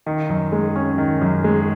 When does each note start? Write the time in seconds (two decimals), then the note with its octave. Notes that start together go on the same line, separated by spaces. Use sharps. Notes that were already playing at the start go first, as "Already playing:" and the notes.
0.06 D#3
0.29 F#2
0.52 G#3
0.75 C#4
0.98 D#3
1.21 F#2
1.44 G#3